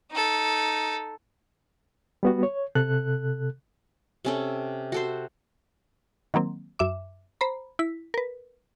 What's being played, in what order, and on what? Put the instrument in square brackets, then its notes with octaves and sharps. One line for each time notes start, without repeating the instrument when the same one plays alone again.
[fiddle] D#4 A4
[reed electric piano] G3 B3 F#4
C#5
C3 A4 F#6
[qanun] C3 C#4 A4
F#4 A4 C5
[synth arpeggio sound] D#3 F#3 A#3 C4
F#2 E5 D6
C5 A#5 B5
E4 B6
A#4 B4